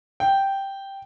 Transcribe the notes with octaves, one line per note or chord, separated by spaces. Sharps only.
G5